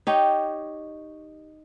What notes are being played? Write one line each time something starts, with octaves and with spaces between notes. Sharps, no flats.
D#4 G4 C#5